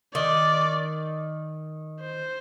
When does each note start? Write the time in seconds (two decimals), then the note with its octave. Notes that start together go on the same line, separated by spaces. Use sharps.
0.14 D#3 D5
2.01 C5